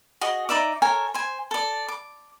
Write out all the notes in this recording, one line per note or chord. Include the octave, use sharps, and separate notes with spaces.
F#4 G#4 D#5
D#4 D5 E5 D6
A4 A#4 C#5 G#5
C5 G#5
A4 D5
D6